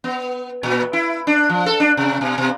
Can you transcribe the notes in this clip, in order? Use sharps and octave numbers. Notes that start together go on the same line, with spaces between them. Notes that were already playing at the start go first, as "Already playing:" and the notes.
B3
A#2
E4
D4
F3
A4
D4
C3
B2
B2